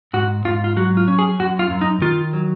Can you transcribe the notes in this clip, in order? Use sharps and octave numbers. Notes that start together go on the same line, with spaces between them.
G#2 F#4
G#2 F4
F4
F#3 F#4
F4
C#4
G#4
F#2 F#4
F4
F#2
D#4
D#3 F4
F#3